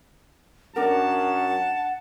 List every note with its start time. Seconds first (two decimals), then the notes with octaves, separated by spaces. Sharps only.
0.76 F#2 D4 A#4 F#5 A5